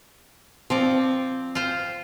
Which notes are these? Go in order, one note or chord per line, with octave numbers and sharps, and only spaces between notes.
F3 C4 D5
F4 C5